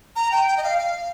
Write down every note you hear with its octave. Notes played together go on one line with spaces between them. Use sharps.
A#5
G5
G5
D#5
F5
F5